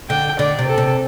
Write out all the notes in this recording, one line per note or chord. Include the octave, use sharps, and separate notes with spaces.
D3 G5
D3 D5
C3
A4
C3